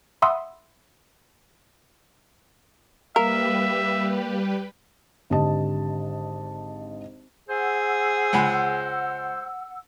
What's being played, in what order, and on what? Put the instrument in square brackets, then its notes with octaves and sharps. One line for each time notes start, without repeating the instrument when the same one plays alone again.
[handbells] E5 F#5 B5 C6 D#6 E6
[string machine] G3 G4 B4 [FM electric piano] A#3 F5 [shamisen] A#4 [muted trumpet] E5
[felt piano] G#1 D3 G4 D#5 A5
[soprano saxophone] G#4 [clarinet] C5 [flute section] F#5 E6
[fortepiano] C#2 G#3 B5